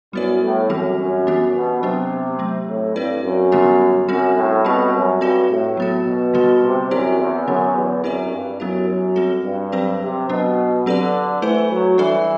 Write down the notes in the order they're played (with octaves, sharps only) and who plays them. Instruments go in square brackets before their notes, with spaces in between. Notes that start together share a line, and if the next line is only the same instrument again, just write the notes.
[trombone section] F#2 [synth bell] G3 B3 E4 B4 D5
[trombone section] A2
[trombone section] F#2 [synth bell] E3 G3 C4 G4
[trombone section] F#2
[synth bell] E3 B3 D4 G4
[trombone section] B2
[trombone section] C3 [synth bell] F#3 B3 D4
[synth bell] F#3 A3 C4
[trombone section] A2
[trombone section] G2 [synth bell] C4 E4 B4 D5
[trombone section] F#2
[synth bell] D3 G3 B3 D4 G4
[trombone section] F#2 [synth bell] G3 C4 F#4
[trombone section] A2
[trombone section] B2 [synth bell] G3 C4 G4
[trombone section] F#2
[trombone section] G2 [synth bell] C4 F#4 A4
[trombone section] A2
[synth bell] F#3 B3 F#4
[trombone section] B2
[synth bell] D3 G3 B3 F#4 A4
[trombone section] C3
[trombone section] F#2 [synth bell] C4 E4 G4 D5
[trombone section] E2
[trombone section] F#2 [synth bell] D3 F#3 B3
[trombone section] E2
[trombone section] F#2 [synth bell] C4 E4 G4 B4 D5
[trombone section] G2
[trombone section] F#2 [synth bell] F#3 B3 E4 G4
[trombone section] F#2
[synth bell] G3 C4 F#4 A4
[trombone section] G2
[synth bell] F#3 C4 G4 C5
[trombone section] C3
[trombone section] B2 [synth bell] F#3 B3 D4
[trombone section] D3 [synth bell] F#3 C4 G4 B4 D5
[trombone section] E3 [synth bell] A3 E4 A4 C5
[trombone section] F#3
[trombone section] E3 [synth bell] G3 D4 A4 D5